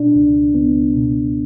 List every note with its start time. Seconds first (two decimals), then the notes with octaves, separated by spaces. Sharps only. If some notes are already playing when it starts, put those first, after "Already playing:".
Already playing: B2 D4
0.16 C#2
0.54 C#2 B3
0.94 B2